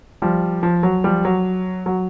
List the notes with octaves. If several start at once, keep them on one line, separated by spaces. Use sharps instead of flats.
F3 G3
F3
F#3
F3 G3
F#3
F#3